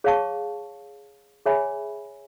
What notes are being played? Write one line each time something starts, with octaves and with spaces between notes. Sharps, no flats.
G#4 C#5 F5 A5 C#6
G#4 C#5 E5 G#5 B5